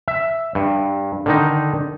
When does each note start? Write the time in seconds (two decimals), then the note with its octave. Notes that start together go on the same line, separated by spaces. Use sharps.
0.08 E5
0.55 G2
1.26 D3 D#3 D#4